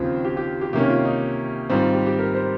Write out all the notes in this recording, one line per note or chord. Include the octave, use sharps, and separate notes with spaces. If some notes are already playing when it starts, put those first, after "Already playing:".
Already playing: D#2 C#3 F3 C4 F4
G4
G4
G4
C3 D#3 A#3 C#4 G4
F4
D#4
G#2 D#3 G3 C4 F4
F4
G4
G4
A#4
C5